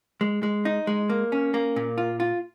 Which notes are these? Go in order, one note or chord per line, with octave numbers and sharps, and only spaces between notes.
G#3
G#3
D#4
G#3
A#3
C#4
A#3
A#2
F4
F4